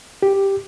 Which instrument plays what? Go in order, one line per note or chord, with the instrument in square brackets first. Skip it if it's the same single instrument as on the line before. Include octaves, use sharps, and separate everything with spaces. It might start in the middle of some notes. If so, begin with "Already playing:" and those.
[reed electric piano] G4